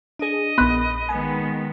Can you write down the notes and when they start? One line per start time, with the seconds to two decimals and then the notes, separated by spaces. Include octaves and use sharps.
0.19 D4 G#4 D#5
0.58 A#1 B3 B5 F#6
1.09 D#3 G#3 B3 G#5